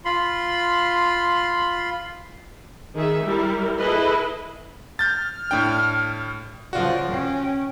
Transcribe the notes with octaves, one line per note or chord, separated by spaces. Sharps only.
F4 B5 C6
D#3 G#4 E5
G3 E4 A#4
E4 G#4 A4 B4 D#5
F6 G6 A6
A2 D4 G5
C#3 F3 F4 F#4 D5
C#4 G5